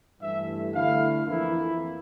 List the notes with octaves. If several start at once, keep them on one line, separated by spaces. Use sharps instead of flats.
G2 E3 A3 E5
D3 A3 E4 F5
F2 E3 A#3 E4